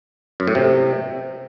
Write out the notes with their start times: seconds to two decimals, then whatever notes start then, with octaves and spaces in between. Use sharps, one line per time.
0.40 F#2
0.47 A2
0.55 C3